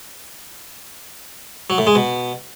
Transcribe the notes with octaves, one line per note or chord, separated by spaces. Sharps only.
F#3
A2
G#3
B2